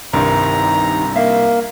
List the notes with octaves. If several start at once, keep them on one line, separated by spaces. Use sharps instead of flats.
C2 G2 C3 D#3 A#5
A#3 E5 F5